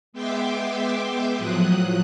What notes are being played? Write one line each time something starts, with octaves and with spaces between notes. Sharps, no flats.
G#3 B3 E5 G5 C6 D6
A2 F3 F#3 D#6 F#6